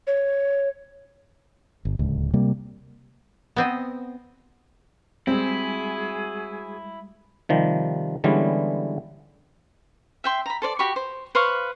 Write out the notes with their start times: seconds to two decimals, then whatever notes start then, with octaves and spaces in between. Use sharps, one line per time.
0.07 C#5
1.85 G1
1.99 D1 C#2
2.33 C3 G3 A#3
3.56 B3 C4 D#5
5.27 G3 G#3 C4 E4 F#4 G#4 G#5
7.49 C3 D#3 F3 G3
8.24 D3 E3 G3 G#3 B3 C#4
10.24 E5 G5 C6
10.46 A#5 B5
10.62 A4 C5 D5
10.79 F#4 G4 B5 C#6
10.96 C5
11.35 B4 C5 F5 C#6